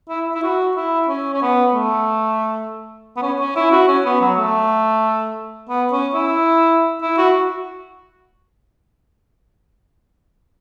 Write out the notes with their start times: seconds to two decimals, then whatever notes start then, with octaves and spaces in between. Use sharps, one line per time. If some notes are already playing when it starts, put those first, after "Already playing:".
0.09 E4
0.35 E4
0.43 F#4
0.76 E4
1.08 C#4
1.34 C#4
1.42 B3
1.74 A3
3.17 B3
3.22 C#4
3.39 C#4
3.55 E4
3.71 F#4
3.88 C#4
4.05 B3
4.21 F#3
4.38 A3
5.69 B3
5.92 C#4
6.14 E4
7.02 E4
7.18 F#4